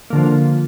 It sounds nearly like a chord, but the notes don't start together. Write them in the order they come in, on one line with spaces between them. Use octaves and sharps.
A#3 D3 F3